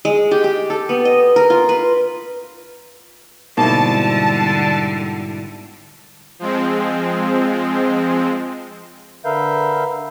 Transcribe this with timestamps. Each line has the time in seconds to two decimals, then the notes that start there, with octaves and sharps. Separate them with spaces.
0.05 G#3
0.31 G4
0.44 G4
0.70 A4
0.89 B3
1.05 D#5
1.36 A#4
1.50 F4
1.69 B4
3.57 G#2 B2 D3 G3 A#3 E4 A5
6.39 F3 G#3 C4
9.25 D3 A#4 B4 E5 F5 G6